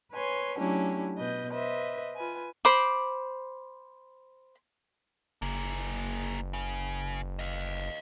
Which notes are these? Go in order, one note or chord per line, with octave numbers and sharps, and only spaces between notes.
B4 C#5 G#5 C6
F#3 A3 C#4 D4 E4 G4
B2 B4 D#5 G6
B4 C5 D#5 E5
F4 B4 G#5
C5 B5 D6
F#1 A#3 G#4
C#3
D#5 F5